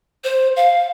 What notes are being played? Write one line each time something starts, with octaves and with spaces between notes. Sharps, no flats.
C5
F5